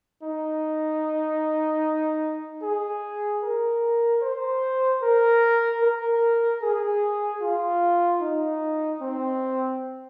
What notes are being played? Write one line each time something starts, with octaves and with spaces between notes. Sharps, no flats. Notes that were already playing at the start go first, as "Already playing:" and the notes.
D#4
G#4
A#4
C5
A#4
A#4
G#4
F4
D#4
C4